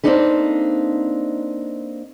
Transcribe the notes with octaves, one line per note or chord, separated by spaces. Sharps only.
A#3 C4 D4 D#4 A4 B4